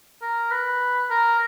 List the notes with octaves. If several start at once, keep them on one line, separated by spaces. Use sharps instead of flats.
A#4
B4
A#4